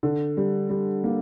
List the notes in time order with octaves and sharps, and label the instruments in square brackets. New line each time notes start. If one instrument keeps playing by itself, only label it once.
[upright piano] D3
G3
G3
A#3